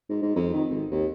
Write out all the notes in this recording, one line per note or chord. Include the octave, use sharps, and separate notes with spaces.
G#2
G#2
F2
D#3
G#1
D#2